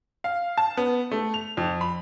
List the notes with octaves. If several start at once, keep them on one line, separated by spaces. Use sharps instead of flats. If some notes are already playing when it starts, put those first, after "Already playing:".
F5
A5
B3
A3
F7
F2
B5